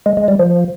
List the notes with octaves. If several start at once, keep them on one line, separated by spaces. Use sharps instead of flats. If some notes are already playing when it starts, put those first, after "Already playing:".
G#3
G#3
G3
F3